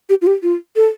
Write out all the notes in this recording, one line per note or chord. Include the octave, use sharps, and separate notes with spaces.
G4
F4
G4
F4
A4